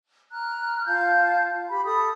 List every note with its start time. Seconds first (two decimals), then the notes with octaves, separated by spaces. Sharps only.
0.32 A#5 F6 F#6
0.87 F4 F5 A5 G6
1.69 G4 B5
1.85 A4 B5 D#6